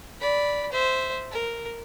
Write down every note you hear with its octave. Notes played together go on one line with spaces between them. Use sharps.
D5 B5
C5 E5
A#4